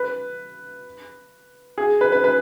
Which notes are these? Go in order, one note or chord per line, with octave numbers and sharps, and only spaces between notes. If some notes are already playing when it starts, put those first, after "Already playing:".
Already playing: B4
G#4
B4
B4
B4